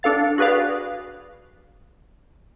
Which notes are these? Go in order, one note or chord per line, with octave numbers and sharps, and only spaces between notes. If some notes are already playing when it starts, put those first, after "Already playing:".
D4 A4 F5 A6
F#4 G#4 B4 D5 F5